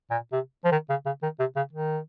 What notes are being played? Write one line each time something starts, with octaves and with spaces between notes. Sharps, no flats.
A#2
C3
F3
D#3
C#3
C#3
D#3
C3
C#3
D#3